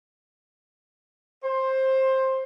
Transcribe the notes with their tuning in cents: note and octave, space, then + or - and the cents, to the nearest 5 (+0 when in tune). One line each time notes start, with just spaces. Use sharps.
C5 +15